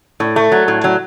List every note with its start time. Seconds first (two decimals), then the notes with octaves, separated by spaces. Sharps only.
0.20 A2
0.36 A3
0.52 F#3
0.68 A2
0.84 F#3